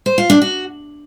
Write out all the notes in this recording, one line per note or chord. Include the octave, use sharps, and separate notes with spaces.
C5
F4
D4
F#4